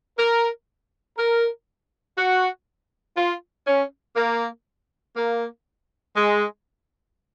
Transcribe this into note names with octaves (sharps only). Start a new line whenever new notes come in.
A#4
A#4
F#4
F4
C#4
A#3
A#3
G#3